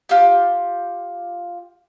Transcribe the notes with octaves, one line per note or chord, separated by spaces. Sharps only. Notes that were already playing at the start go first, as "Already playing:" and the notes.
F4 G4